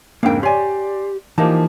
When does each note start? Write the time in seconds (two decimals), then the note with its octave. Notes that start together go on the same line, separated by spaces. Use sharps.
0.23 F2 G#2 C#3 A#3 D4 A#4 F5 G5
0.43 G4 C#5 D5 G#5 C6
1.38 E3 F3 A#3 D#4 G4 D#5 A5